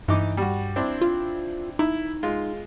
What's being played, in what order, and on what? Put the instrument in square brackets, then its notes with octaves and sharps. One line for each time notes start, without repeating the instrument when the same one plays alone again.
[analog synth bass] G2 [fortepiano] E3 D#4 D6
[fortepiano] G3 F#4
C4 D4 E4
[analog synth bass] F4
[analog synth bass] D#4 [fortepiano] E4
[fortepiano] G#3 F4